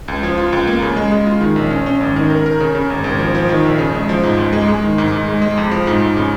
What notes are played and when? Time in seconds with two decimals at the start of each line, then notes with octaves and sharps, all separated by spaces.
0.08 C#2
0.23 F3
0.38 F4
0.53 C#2
0.67 A#3
0.82 C#3
0.96 G#3
1.12 G#3
1.27 F4
1.41 D#3
1.56 A#1
1.70 C#4
1.86 C#4
2.01 G#1
2.16 D#3
2.30 A#4
2.46 A#4
2.60 C#3
2.75 C#3
2.90 G#1
3.04 G#1
3.19 F3
3.35 F3
3.49 D#3
3.65 A#1
3.78 C#3
3.94 G#3
4.09 F3
4.23 G#2
4.38 C#2
4.52 G#3
4.68 G#3
4.83 D#3
4.98 G#2
5.12 G#2
5.28 G#3
5.42 G#3
5.58 F2
5.71 F3
5.87 G#2
6.01 G#2
6.17 C#3